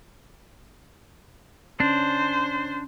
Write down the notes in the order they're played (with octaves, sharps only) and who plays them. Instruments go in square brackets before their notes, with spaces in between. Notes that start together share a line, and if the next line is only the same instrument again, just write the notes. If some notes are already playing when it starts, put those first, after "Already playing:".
[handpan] C#4 [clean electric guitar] D4 [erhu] C5